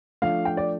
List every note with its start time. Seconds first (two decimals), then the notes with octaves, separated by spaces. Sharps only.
0.22 F3 A3 D4 F5
0.45 G5
0.57 D5